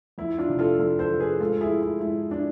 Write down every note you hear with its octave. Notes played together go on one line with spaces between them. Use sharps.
F2 E4
D4 F4
C3 F3
F4 A4
F2 F4 A4
A4 C5
C3 F3
G#4 B4
G#2 F4 A4
E4 G#4
F3
E4
G#2 E4
F3 D4